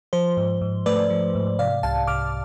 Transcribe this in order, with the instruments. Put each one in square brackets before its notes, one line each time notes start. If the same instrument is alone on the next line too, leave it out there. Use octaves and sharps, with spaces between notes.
[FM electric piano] F3 C5
G#2
G#2
A3 B4 D5
F3
G#2
C3 D5 F5
C2 F5 A5
C2 D6 F6